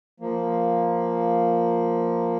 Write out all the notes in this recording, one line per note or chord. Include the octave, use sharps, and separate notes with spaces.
F3 A#3